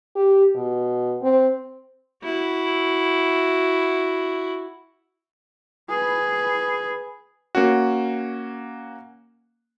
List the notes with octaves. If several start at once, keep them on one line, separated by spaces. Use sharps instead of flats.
G4
B2
C4
E4 F#4
G#4 B4
A#3 C#4 F#4